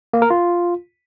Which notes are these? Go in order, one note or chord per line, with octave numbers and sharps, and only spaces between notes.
A#3
A#4
F4